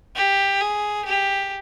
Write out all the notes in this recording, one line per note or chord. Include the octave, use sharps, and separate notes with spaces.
G4
G#4
G4